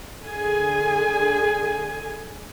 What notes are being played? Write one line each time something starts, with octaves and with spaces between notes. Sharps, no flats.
D3 G#4 G#5